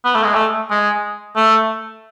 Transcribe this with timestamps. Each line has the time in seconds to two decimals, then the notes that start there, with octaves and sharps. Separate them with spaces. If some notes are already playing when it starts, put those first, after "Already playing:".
0.05 B3
0.15 A3
0.24 G#3
0.35 A3
0.71 G#3
1.36 A3